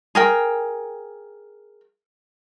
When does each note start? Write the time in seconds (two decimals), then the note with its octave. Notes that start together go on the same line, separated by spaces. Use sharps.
0.15 G#4 A#4 G5